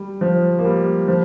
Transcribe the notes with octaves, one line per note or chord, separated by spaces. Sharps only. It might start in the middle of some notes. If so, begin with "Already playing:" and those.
Already playing: G3
F3
A#3
G3
F3